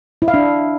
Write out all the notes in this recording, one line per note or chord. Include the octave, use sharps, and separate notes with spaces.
E4
F5
D4